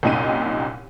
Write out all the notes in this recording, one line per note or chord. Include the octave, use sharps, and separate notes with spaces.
C2 F#2 A#2 D#4 G5 D#7